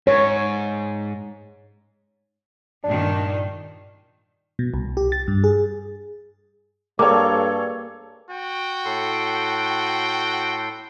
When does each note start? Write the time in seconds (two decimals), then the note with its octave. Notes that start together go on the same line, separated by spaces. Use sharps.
0.07 G#2 C#5
2.84 G2 A#2 D#3 D4
4.59 B2
4.74 C2
4.97 G4
5.12 A6
5.28 G2
5.44 G#4
6.99 G2 A#3 G#4 A4 C#5 D6
8.30 F#4 G5
8.85 A2 A4 C6